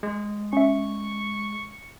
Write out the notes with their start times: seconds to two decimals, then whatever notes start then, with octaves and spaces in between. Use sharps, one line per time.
0.03 G#3
0.53 C#4 E5 C#6